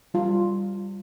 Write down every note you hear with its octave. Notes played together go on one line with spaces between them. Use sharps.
G3 F4